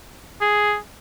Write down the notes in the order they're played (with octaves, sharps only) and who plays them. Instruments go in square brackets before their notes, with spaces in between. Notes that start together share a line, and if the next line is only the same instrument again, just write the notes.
[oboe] G#4